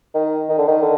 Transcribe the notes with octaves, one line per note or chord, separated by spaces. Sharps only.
D#3
D#3
D3
D#3
D3